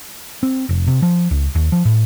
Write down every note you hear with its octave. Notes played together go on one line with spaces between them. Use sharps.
C4
F1
C3
F3
C#2
D#2
F3
A2